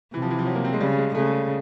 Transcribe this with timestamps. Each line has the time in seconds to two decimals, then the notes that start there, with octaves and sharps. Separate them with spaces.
0.13 C3 E3
0.22 F3
0.30 E3
0.38 F3
0.47 F#3
0.55 A#3
0.64 C4
0.73 G#3
0.81 C#3 G3
0.98 G#3
1.15 C#3 A3